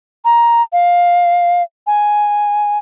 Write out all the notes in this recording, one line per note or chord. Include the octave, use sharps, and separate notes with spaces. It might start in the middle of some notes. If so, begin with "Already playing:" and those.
A#5
F5
G#5